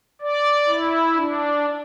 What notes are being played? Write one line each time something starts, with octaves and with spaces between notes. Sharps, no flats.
D5
E4
D4